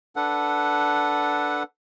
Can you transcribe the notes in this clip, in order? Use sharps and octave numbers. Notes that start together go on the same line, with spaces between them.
D4 A4 B4 F#5